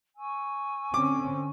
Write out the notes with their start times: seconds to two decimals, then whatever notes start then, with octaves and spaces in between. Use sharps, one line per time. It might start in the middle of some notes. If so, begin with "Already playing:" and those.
0.17 G#5 C#6 E6
0.94 D3 C4 C#4 D6